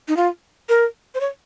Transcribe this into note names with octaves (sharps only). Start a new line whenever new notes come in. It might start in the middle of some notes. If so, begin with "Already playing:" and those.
D#4
F4
A#4
C5
C#5